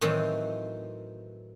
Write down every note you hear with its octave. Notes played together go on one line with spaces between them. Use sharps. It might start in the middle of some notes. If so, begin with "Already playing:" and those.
A2 D#3 E3 F#3 C4